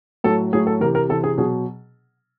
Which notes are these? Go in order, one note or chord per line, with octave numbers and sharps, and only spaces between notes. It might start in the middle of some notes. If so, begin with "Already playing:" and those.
A2 F#3 A4
A2 F#3 G#4
A4
C3 E3 A#4
A#4
C3 E3 A4
G#4
B2 F#3 G#4